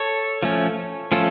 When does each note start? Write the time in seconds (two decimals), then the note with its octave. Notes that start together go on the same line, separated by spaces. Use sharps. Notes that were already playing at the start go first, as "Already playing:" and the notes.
Already playing: A4 C#5
0.43 F3 A3 C#4
1.12 F3 A3 C#4 F4 A4